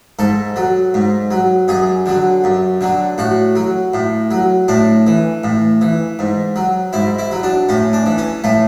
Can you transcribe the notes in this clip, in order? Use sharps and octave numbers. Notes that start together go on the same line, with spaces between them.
G#2 A4
F#3
G#2
F#3
F#2 G#4
D3 F#3
F#2
D3 F#3
A2 F#4
F#3
A2
F#3
A2 D4
E3
A2
E3
G#2
F#3
G#2 E4
E4
F#3
D4
A2 C#4
D4
E3
C#4
A2 A3